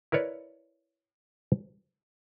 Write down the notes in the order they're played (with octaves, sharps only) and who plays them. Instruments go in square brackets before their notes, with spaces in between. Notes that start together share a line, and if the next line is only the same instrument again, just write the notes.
[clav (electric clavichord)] E4 A#4 B4 C#5 D5